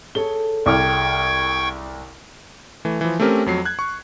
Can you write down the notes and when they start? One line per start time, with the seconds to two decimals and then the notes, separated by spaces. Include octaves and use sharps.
0.15 G#4 A4 C#5 G7
0.66 C2 G5 C#6 D6 F6 G#6
2.85 E3 A3
3.01 E3 F3
3.20 A3 C4 C#4 G4 A#4
3.46 F2 F#3 C7
3.65 F#6 G#6
3.79 C#6